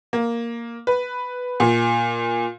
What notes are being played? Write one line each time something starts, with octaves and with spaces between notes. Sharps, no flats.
A#3
B4
A#2